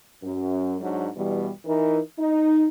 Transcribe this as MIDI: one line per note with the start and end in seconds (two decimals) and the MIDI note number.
0.22 0.75 42
0.80 1.08 44
0.80 1.08 54
0.80 1.08 62
0.80 1.08 66
1.16 1.49 40
1.16 1.49 47
1.16 1.49 52
1.16 1.49 55
1.65 1.98 52
1.65 1.98 63
1.65 1.98 70
2.18 2.66 63